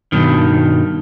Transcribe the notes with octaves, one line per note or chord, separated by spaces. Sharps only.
G2 B2 D#3